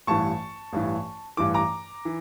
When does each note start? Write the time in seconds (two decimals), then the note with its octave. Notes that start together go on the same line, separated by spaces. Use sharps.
0.07 A1 G2 E3 A5 C#6
0.73 A1 G2 E3
1.37 A1 G2 E3 D6
1.54 A#5 D6
2.05 E3